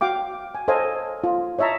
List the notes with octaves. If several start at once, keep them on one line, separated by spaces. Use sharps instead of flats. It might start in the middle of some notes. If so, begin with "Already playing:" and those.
F#4 F5 G5 D6
G#5
A4 C5 C#5 D#5 F5 G#5
F4
C#5 D#5 E5 A5 A#5